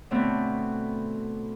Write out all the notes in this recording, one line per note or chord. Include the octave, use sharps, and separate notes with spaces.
B2 D3 A3 B3 C4